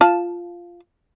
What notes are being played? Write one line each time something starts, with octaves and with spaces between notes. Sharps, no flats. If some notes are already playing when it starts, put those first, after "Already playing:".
F4 A5